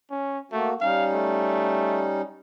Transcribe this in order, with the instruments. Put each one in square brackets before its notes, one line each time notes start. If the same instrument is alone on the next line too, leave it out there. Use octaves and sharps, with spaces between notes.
[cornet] C#4
[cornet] A3 [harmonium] A#3 F#4
[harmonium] G3 C#4 D#4 [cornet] F5
[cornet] A3